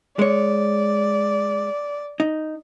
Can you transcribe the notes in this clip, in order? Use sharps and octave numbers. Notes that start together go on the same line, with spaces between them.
G#3 C#5 D5
D#4